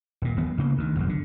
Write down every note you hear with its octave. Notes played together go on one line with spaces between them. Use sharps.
D#1 A#2
D1 E3 B3
D2 C#3 A#3
D2 D#3
F#1 B1 F2
D3